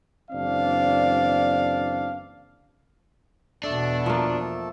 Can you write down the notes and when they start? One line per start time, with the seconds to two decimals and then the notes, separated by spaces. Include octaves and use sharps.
0.31 F#1 E3 C4 D4 D5 F5
3.64 E2 B2 A3 D4 A4
4.06 F3 A#3